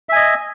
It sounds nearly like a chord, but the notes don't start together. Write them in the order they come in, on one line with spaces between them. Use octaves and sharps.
E5 G#5 D#5